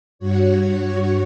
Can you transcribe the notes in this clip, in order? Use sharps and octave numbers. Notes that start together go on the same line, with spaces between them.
G2 F#4 C#5